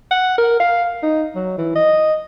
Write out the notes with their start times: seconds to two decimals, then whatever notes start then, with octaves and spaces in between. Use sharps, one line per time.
0.11 F#5
0.38 A#4
0.60 F5
1.03 D#4
1.35 F#3
1.58 E3
1.75 D#5